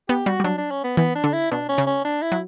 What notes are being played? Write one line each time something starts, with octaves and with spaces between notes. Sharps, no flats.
B3 G4
G3 F#4
G3
F#3 D4
D4
C#4
B3
E3 B3
D4
D3
E4
B2 D4
C#4
C#3
C#4
D4
E4
F#3